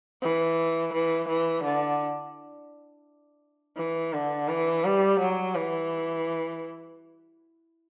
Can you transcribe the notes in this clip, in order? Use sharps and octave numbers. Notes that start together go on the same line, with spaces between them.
E3
E3
E3
D3
E3
D3
E3
G3
F#3
E3